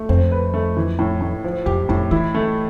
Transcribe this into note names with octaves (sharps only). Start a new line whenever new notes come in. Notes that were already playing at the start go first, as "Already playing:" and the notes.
Already playing: A3
F2 C4
B4
A3
E3
A2
A2
F3
F2 G4
F2 A2
E3 E4
A3